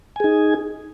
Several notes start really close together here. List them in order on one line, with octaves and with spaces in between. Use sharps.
G#5 G#4 D#4